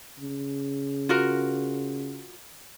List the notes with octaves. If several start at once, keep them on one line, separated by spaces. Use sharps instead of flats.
C#3
F4 F#4 A#4